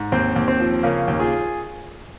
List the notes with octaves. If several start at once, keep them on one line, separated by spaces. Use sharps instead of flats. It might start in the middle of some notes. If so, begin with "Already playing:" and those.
Already playing: G#2
D#2 C4
D#2
C4
F3
C#3 A#3 C#4
D#2
F4 G#4